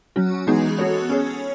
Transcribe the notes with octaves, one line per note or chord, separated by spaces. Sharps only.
F#3 C#4 F#4
E3 G#3 B3 D#4 G#4
B3 F#4 A4 C#5
C#4 G#4 C#5